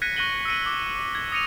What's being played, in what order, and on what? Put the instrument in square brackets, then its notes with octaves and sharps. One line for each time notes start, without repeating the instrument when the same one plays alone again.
[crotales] F#6 G#6 A#6 B6 C#7 D#7
C#6 F#6 A#6 D#7 F#7 G7
E6 A#6 C#7 D#7
D6
G#6
D#6 A#6 C#7 D#7 F7